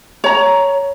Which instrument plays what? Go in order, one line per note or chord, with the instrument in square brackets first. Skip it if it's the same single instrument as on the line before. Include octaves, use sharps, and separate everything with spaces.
[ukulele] C#5 A#5